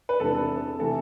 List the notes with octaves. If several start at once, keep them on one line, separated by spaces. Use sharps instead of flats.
B4
E2 C3 G#3 D4 A4
A4
C3 E3 A3 A4